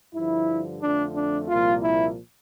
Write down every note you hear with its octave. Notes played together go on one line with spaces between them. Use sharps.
G2 D3 F3 E4
F2 D3 F3 A3 D4
D4
C2 A#2 F3 A#3 F4
E4